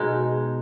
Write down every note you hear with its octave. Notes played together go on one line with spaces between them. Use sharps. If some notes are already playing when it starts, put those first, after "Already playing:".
Already playing: B2 G#3 D#4